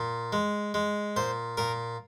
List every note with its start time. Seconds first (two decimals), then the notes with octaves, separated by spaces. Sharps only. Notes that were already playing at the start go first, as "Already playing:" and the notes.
Already playing: A#2
0.33 G#3
0.74 G#3
1.16 A#2 C5
1.57 A#2 A#4